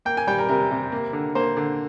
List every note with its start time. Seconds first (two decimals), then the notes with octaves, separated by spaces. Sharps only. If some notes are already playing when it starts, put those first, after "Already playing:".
0.05 A#3 G5
0.17 G#5
0.27 G3 G5
0.38 A#4
0.49 C3 A#4
0.71 C3
0.92 A#3
1.13 D3
1.35 A#3 C5
1.57 D3